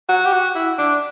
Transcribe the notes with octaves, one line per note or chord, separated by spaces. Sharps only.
F#4
G4
F#4
E4
D4